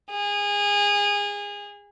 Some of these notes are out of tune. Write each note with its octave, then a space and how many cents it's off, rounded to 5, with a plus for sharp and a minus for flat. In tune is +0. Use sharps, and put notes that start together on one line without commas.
G#4 -25